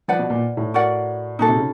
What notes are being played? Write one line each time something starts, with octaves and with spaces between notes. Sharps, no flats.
F3 B4 D5 F#5
B2
A#2
A2
F#4 A#4 D5 F#5
A#2 D#4 F#4 A4
C3
C#3